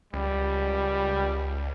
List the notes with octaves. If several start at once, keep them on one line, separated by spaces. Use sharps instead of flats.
C#2 G3